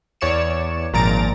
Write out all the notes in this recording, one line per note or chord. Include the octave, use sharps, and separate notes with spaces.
E2 C#5 D5 C#7 E7
G#1 A#2 F3 A#5 A6 D7